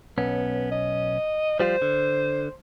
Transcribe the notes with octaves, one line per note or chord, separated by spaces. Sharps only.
B1 B3 C#4
D#5
F3 G3 F4 C5
D3